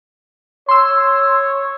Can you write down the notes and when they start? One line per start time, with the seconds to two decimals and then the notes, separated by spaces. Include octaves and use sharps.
0.69 C#5 C6 E6